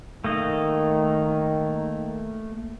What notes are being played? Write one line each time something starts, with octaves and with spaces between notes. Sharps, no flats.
D#3 A3 A#3 D#5